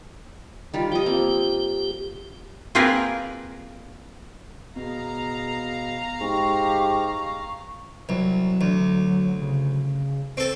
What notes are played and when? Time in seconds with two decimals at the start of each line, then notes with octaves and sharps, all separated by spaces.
0.74 D#3 G3 F4
0.92 F3 G4 D#5
1.06 A#3 C4
2.75 A#3 C4 F4 G#4 A#4 B4
4.76 B2 G#4 F5 A#5
6.21 G#2 G4 C#6
8.09 C2 F#3
8.61 D2
9.41 C#3
10.37 C4 A4